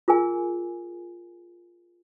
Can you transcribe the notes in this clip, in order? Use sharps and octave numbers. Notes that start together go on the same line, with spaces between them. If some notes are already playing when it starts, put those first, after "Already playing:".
F4 G#4 A#4 G#5